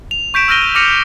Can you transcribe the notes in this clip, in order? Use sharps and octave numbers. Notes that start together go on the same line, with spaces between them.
F7
C#6 G6 B6 D7 E7
E6 F6 G6 A#6 D#7 G7
D6 F6 A#6 C#7 F7